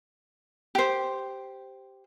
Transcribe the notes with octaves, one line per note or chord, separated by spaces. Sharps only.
G4 C5